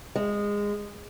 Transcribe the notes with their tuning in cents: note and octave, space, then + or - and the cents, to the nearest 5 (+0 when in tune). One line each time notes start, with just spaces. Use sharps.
G#3 -20